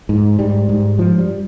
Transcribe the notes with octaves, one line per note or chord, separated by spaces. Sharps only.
G#2
G#2 G3
G#2
G2 F3
G3